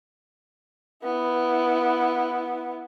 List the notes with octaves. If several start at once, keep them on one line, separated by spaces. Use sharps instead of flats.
B3 E4